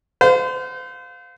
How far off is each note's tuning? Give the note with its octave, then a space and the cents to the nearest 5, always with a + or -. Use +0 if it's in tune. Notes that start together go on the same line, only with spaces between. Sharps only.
C5 -35 F5 +20